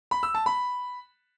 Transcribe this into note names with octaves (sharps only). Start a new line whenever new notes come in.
B5
E6
A5
B5